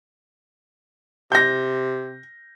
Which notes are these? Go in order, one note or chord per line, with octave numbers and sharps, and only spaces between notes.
C3 G6 A#6